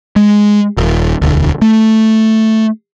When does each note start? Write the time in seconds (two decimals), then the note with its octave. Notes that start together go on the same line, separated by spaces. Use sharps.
0.16 G#3
0.77 D#1
1.22 E1 D2
1.62 A3